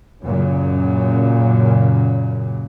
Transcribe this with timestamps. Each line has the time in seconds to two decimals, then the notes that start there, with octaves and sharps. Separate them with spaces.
0.22 F#2 A#2 C#3